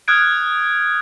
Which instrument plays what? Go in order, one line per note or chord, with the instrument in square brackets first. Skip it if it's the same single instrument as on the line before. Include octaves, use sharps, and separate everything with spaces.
[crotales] D#6 F6 F#6 G#6 D7